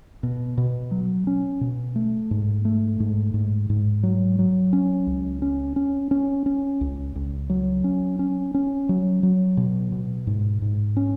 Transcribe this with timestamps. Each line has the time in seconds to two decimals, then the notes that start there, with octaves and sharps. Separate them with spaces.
0.23 B2
0.57 B2
0.91 F#3
1.27 C#4
1.61 B2
1.96 A3
2.31 G#2
2.65 A3
3.00 G#2
3.34 G#2
3.70 G#2
4.03 F#3
4.39 F#3
4.73 C#4
5.07 C#2
5.42 C#4
5.76 C#4
6.11 C#4
6.46 C#4
6.81 C#2
7.15 C#2
7.49 F#3
7.84 C#4
8.19 C#4
8.54 C#4
8.89 F#3
9.23 F#3
9.57 B2
9.92 B2
10.27 G#2
10.62 G#2
10.97 C#4